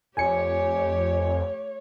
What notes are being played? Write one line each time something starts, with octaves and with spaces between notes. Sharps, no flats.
F2 A3 G4 C#5 G#5 C#7